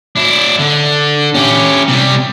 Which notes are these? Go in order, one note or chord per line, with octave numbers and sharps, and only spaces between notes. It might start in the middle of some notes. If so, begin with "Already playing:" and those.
D4 E4
D3
C#4 G4
C3 G3